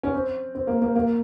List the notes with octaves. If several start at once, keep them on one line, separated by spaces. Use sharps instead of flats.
C#4
C4
C4
A#3
A#3
A#3